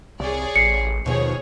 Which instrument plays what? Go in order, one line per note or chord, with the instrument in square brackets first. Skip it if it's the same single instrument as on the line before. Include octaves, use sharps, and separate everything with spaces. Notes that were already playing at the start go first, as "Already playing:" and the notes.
[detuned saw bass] C2 [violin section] G#4 C#5 D5
[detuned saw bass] A1 [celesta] C7 C#7
[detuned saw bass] D#2 [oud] B2 F3 [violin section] G#4 C#5